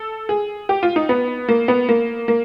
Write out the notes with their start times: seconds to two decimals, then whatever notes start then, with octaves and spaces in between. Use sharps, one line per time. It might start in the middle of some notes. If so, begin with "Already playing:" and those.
Already playing: A4
0.29 G#4
0.69 G4
0.83 F4
0.96 D#4
1.09 B3
1.49 A#3
1.68 B3
1.89 A#3
2.28 A#3